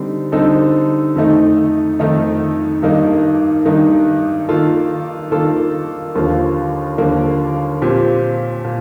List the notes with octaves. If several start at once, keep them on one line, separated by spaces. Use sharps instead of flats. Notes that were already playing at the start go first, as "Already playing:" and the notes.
Already playing: D3 G3 C4 D#4
D3 G3 C4 D#4 A4
F2 D#3 A3 D#4
F2 D#3 A3 D#4
G2 D#3 A#3 D#4
G2 D#3 A#3 D#4
D#3 A#3 F4 A4
D#3 A#3 F4 A4
D#2 D3 F3 A#3 F4
D#2 D3 F3 A#3 F4
A#2 F3 C4 G4
A#2